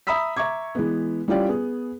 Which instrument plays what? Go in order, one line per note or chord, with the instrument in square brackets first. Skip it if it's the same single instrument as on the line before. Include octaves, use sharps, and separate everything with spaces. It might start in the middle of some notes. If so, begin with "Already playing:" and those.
[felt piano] E5 A#5 B5 D#6 E6 B6
E5 A#5 C#6 D6 G#6
E3 G#3 B3
G3 C#4 E4 F4 G4 D5
B3 G#4